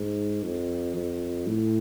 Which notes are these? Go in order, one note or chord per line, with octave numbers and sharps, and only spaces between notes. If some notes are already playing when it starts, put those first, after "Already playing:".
Already playing: G#2
F2
F2
A2